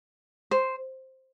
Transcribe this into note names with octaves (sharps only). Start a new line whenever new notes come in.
C5